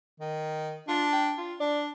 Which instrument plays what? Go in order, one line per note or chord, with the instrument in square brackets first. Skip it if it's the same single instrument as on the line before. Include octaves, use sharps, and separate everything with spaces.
[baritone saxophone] D#3
[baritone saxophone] D4 [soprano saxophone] F4
[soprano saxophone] G5
F4
[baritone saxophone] D4 [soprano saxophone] D5